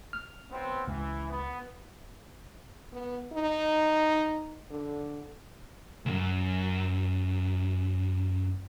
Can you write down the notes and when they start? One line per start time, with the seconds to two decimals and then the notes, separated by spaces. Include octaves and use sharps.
0.13 F6
0.50 B1 B3 C4
0.88 C#2 E3
1.30 B3
2.93 B3
3.33 D#4
4.70 D3
6.06 C#2 F#2